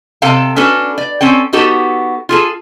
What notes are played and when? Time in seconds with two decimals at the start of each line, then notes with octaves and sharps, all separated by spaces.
0.22 C3 A4 F5 G5 A5
0.56 C#4 D4 F#4 A4 B4
0.98 D5
1.21 C4 C#4 A4 G5
1.53 B3 D#4 F#4 G4 A4
2.29 F4 G#4 A4